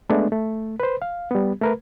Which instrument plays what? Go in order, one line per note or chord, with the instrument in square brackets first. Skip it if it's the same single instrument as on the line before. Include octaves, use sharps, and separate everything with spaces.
[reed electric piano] G#3 A3 B3 D4
A3
B4 C5
F5
G3 B3
A3 A#4 B4